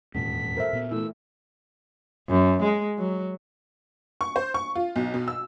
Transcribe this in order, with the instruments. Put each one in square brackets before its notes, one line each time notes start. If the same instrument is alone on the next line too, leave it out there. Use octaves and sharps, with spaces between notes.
[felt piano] D#1 [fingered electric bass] E2 G#2 [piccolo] B6
[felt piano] A4 C5 [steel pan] A#4 E5
[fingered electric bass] A#2 B3
[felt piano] E3 A3 [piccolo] E6
[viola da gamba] F#2
G#3
F#3
[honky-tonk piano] C#6
C5
C#6
F4
B1
B2
E6